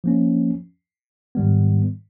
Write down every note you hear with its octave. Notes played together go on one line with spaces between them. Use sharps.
F3 A#3 C#4
G#2 D#3 G3 B3